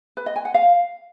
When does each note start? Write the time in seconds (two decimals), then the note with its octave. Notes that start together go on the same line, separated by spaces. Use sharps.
0.17 B4
0.26 D#5
0.36 G#5
0.45 F#5
0.54 F5